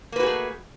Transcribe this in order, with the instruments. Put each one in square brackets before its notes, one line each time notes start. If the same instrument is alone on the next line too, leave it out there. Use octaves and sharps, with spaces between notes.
[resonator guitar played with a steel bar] A#3
B4
F#4
G#4
A3